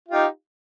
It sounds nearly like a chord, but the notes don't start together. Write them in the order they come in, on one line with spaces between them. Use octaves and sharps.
F4 G4 D#4